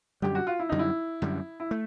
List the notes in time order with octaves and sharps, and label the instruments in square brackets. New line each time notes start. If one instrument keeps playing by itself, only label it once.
[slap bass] F#2 D3 G3 [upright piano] G4
[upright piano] F#4
F4
E4
[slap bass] F#2 D3 G3 [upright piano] D#4
[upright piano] E4
[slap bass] F#2 D3 G3
[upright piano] E4
[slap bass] A3